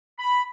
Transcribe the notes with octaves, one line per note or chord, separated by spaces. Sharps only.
B5